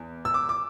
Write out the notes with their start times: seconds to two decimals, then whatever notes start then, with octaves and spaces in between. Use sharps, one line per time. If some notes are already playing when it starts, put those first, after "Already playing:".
Already playing: E2
0.25 E6
0.34 D6
0.49 D6